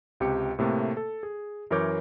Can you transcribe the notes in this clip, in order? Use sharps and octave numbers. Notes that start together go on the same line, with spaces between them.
C#2 C3 G4 C#7
A2 C3 A3 A#3
A4
G#4
F#2 E3 A#4 C#5 D6 G6